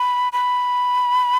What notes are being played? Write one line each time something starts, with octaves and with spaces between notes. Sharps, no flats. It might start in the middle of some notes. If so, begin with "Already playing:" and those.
Already playing: B5
B5